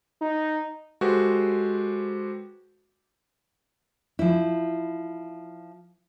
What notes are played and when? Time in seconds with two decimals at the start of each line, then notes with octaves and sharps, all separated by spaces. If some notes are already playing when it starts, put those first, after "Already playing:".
0.21 D#4
1.01 G#3 F#4 G4 A4 B4 C5
4.19 F3 E4